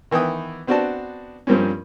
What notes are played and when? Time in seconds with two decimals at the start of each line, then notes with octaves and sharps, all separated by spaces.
0.11 D#3 E3 B3 G5 D#6
0.67 B3 C4 D4 F#4 D5 A5
1.47 G2 F3 G3 A#3 C4 C#4